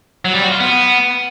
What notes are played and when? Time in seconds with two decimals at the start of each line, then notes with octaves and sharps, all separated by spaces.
0.25 F#3
0.34 G3
0.42 F#4
0.51 F4
0.60 B3